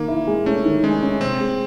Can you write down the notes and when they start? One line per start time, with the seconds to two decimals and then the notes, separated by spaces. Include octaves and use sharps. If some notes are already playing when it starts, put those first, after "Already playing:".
Already playing: D#3 A#3
0.08 E4
0.27 G#3
0.46 A3 C#4
0.65 D#3
0.83 G#3 C#4
1.02 C#4
1.21 C3 C4
1.40 G#3